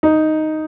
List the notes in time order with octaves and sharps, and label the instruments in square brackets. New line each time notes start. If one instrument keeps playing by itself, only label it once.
[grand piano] D#4